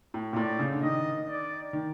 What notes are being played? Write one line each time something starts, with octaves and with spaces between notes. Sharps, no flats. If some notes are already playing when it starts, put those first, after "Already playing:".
A2
A#2
A2 D5
C#3
D3
D#3 D#5
D5
D#3